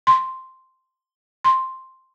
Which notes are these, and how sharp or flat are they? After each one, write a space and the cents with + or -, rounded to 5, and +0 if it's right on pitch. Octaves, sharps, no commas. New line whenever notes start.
C6 +0
C6 +5